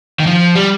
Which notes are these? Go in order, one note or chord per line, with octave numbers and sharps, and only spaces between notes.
D#3
F3
G3